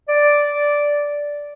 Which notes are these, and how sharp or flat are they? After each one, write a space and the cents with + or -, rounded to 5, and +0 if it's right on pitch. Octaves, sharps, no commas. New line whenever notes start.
D5 -5